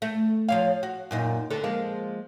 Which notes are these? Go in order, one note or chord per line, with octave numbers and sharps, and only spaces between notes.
A3
F3 C#5 F5
F#4
F#2 A#2 D#4
D2 D3 A4
F3 G#3 A#3